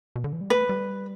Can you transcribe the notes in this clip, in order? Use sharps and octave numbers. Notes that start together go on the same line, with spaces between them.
B2
D3
E3
G3
A3 B4
G3